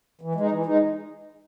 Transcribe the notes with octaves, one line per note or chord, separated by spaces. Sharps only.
E3
G#3
D#4
E3
G#3 D#4